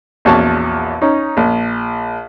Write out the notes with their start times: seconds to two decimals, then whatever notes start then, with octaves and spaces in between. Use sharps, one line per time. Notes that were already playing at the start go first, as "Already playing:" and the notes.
0.25 A#1 E2 C#4 F#4 A5
1.01 C#4 D#4
1.37 A#1